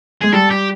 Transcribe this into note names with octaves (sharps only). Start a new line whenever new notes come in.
G#3 G#4
G3 A4
G4